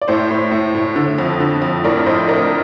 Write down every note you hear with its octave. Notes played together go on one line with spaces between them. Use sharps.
D5
A2 C5
A2
A2
A2
D3
F2
D3
F2
A2 A#4 D5
A2 C5 D#5
A2 A#4 D5